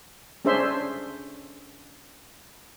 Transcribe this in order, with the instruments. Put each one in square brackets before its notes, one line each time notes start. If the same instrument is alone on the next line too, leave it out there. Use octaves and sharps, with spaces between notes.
[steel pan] C#4 D4 G#4 C5 E5 C6